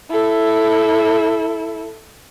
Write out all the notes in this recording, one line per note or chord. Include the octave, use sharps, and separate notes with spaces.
E4 A4